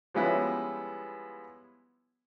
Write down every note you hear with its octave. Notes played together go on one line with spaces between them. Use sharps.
F3 G3 G#3 B3 C#4 E4